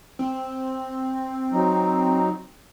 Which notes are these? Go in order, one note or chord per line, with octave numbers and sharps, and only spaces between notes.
C4
F#3 D#4